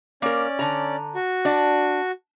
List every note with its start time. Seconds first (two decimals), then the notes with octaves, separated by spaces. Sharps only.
0.22 A#3 C#4 A#4 D5
0.59 D3 A#5
1.15 F#4
1.45 D4 D5